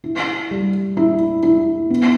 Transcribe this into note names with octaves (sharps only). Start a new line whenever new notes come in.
E4
G3
E4
E4
B3